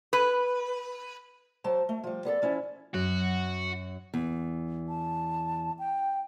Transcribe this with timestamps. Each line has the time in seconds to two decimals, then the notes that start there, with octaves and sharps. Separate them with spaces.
0.13 B4
1.64 F#3 C5 A5
1.89 A3
2.04 F3 G3
2.25 B3 G#4 A4 D5
2.42 F3 C#4 E4
2.94 F#2 F#3 F#4
4.14 E2
4.89 A5
5.79 G5